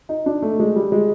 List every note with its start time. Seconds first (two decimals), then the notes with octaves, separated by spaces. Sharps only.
0.09 D#4
0.26 D4
0.42 A3
0.59 G#3
0.76 G3
0.92 G#3